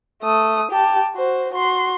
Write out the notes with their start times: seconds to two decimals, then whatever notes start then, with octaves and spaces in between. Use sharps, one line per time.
0.23 A3 D#6
0.71 G4 A5
1.15 F#4 C5
1.53 F#4 C6